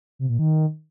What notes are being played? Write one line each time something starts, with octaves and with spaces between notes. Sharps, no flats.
C3
A#2
D#3